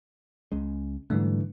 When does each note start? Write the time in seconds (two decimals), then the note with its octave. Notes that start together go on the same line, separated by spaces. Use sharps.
0.52 C#2 C#3 G#3
1.10 G#2 D3 E3 G3 A3